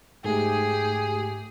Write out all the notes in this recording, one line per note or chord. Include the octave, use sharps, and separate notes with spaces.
G#2 A3 G4 G#4 G5